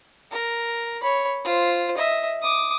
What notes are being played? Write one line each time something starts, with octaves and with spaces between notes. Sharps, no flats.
A#4
C#5 B5
F4 C5
D#5 E5
D6 D#6